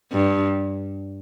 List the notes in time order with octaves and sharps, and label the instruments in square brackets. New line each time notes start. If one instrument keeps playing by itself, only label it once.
[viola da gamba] G2